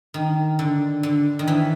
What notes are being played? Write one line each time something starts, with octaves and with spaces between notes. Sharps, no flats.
D#3
D3
D3
D#3
E3